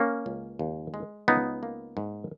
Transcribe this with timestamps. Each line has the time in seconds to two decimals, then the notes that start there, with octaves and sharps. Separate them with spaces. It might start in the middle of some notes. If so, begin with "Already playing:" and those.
Already playing: A#3 C#4
0.26 C#2
0.59 D#2
0.94 G#3
1.28 C#2 B3 D#4
1.63 A#3
1.97 G#2